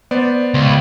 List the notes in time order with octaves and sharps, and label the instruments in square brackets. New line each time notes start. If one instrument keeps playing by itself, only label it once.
[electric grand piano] B3 C5 D5
[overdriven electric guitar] C#2